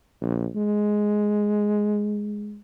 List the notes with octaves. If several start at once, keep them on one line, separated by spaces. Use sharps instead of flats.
A#1
G#3